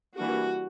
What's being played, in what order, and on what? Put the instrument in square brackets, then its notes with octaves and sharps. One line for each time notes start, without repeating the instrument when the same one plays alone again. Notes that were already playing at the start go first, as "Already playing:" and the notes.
[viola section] E3 G3 A#3 D4 F#4